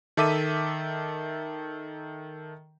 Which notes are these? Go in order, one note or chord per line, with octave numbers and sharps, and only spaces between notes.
D#3 A4 E5 D6 B6 D#7